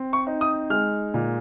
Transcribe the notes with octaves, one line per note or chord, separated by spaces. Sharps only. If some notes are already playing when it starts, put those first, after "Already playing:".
Already playing: C4
C#6
D#4
D#6
G#3 F6
A#2